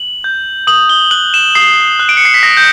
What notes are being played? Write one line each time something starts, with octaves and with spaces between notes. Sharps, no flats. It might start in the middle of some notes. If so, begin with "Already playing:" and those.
Already playing: F#7
G6
D#6 F#7
G7
F#6 F#7
E7
D#6 C7
F#6
D7
C#7
C7
B6
D#6 A#6
G6